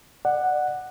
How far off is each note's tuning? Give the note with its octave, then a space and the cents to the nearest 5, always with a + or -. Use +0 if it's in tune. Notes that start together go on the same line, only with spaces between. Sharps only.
D5 +25 F#5 +0